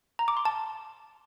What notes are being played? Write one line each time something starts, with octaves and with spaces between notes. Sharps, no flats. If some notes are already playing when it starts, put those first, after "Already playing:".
A#5
D6
C6
A5